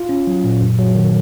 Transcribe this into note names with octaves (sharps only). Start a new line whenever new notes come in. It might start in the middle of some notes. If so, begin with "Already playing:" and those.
Already playing: F4
C#4
F#3
A#2
F#2
F#3
D#3